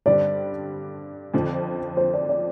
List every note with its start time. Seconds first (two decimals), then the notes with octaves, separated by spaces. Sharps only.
0.06 G2 D3 G3 C4 D5
1.34 F2 D3 F3
1.97 C5
2.13 D5
2.29 D5